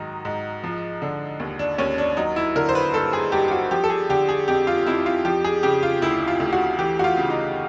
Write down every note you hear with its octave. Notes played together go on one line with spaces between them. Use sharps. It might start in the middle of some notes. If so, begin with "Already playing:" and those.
Already playing: G#2 D#3 F#3 D#4
G#2
F3
D3
D#2
D4
D#2 C#4
D4
F#3 D#4
E4
D3 A#4
C5
B4
G2 A4
G#4
G2 G4
G4
F#4
F3 G4
A4
G#4
D3 G4
G#4
F2 G4
F4
F2 E4
F4
F3 G4
G#4
C#3 G4
F4
D2 E4
F4
D2
F#4
E3 G4
F#4
F4
C#3
D#4